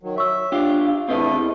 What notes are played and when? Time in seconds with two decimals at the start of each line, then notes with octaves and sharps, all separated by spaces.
0.03 D#3 F#3
0.16 C#5 E5 C#6 E6
0.52 D4 F4 G4
0.86 F5
1.09 E2 A3 C4 D4 B4 D#5